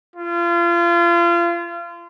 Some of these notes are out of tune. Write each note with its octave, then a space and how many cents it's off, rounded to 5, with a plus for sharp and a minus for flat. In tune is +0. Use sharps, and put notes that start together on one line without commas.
F4 -30